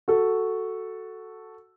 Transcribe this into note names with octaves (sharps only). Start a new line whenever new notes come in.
F#4 A4